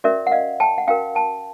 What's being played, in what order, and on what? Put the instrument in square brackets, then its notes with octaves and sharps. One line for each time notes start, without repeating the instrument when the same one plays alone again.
[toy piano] C#4 F#4 A#4 D5 E5
F#5
D#5 F5
G5 A5
F#5
C#4 F#4 A#4 F5 G5
G5 A5